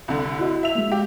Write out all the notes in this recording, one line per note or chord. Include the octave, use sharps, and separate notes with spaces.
C2 D3
E4 F#4 D#5
E5 F7
G#3 A#3
G4